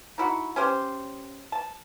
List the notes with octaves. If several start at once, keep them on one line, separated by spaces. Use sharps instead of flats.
D#4 E4 F#4
C#4 G4 C5
A5